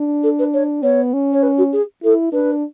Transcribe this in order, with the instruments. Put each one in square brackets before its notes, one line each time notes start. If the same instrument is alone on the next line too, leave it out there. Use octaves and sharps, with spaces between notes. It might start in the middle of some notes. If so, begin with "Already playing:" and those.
Already playing: [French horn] D4
[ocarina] A4
B4
C#5
[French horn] B3 [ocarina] C#5
[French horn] C#4
[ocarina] C#5
B4
F#4
G#4
[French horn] E4 [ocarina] A4
[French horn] D4 [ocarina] B4